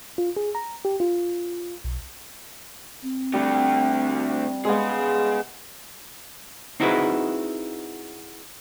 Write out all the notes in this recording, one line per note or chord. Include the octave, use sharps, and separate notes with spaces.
F4
G#4
A#5
G4
F4
B1
C4
D3 G3 A3
G#3 B3 G#4 F5
C4 D#4 E4 F#4 G#4 B4